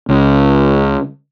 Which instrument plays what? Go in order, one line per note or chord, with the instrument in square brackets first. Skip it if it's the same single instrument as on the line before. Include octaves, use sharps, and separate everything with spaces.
[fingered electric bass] C#2